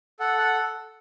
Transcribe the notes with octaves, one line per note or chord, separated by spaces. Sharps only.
A4 F#5
F#5